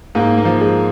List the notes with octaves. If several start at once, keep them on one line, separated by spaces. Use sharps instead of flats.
G#2 A#3
A#3
F3
G#3